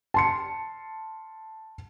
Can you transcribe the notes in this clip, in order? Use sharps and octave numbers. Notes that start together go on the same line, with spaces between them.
A5 C6 C#7